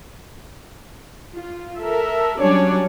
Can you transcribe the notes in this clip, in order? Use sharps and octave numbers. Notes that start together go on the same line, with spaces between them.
F4
A4 A#4 E5
F#3 G3 C#4 D4 C#5 D5